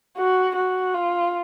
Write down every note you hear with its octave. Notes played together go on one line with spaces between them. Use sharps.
F#4
F#4
F4